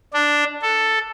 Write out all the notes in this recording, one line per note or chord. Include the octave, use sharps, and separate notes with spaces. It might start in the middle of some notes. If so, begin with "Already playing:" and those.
D4
A4